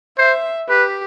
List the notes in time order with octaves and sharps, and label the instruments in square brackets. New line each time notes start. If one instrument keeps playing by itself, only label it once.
[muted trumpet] C5 [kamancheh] E5
[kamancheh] G4 [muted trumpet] B4